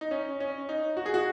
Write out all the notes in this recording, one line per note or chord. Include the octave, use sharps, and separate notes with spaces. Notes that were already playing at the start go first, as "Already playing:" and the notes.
D#4
C#4
C#4
D#4
F#4
G#4
F#4